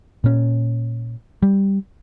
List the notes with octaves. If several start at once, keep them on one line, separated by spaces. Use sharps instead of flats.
A#2 C#4
G3